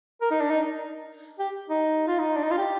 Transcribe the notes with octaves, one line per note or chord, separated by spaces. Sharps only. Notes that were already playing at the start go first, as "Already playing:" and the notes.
A#4
D#4
D4
D#4
G4
D#4
F4
D#4
D4
D#4
F4
G4